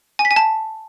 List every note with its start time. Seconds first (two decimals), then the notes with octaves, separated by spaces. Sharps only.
0.19 G#5
0.25 B6
0.31 G#5
0.36 A5